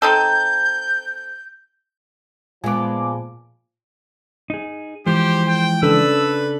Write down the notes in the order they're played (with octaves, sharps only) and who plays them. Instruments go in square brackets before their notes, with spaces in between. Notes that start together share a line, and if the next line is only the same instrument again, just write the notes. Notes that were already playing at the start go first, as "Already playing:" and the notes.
[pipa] C4 D#4 A4 [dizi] G6
[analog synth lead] A#2 [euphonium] F3 [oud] G#3 B3 [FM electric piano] G#5 D6
[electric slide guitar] D#4 G#4
[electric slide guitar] E3 F3 G#3 [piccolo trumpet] G4 [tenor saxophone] C5
[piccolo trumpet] G5
[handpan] C#3 D4 A4 [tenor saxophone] B4 [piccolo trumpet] E6